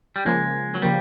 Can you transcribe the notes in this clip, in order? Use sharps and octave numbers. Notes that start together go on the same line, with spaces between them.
G3
C#3 F3 G#3 A#3
F#3
C#3 F3 G3 A#3